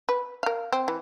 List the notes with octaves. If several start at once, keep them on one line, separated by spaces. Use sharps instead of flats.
B4
A#4 F5
C4
E3